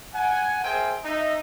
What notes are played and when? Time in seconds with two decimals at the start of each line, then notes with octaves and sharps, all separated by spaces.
0.14 F#5 G#5
0.63 G#4 A#4 C5 E5 G5 G#5
1.04 D#4 E5